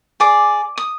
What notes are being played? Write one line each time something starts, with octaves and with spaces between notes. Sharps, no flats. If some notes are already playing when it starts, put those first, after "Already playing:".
G#4 D5 D6
D#6